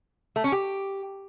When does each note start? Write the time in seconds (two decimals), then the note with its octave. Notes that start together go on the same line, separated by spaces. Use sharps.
0.36 A3
0.44 C#4
0.52 G4